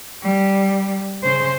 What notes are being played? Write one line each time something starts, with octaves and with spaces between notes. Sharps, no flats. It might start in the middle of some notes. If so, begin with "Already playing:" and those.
G3
C#3 C5